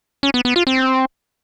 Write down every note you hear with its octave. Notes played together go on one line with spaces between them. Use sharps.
C#4
B3
B3
F4
C4